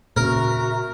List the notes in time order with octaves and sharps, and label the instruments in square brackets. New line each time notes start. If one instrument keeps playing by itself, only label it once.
[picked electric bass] A#2 C#3 [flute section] F#4 E5 A#5 [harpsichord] A#4